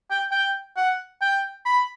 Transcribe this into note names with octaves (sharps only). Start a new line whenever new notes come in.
G5
G5
F#5
G5
B5